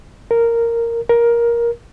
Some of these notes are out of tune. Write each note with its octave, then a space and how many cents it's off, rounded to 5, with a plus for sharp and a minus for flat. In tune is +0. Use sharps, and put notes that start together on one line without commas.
A#4 -5
A#4 +15